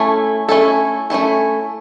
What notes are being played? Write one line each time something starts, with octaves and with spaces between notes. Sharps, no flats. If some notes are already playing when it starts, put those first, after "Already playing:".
Already playing: A3 C#4 E4 A4
A3 C#4 E4 A4
A3 C#4 E4 A4